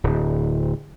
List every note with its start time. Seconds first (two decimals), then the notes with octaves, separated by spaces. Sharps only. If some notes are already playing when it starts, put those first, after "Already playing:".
0.04 D1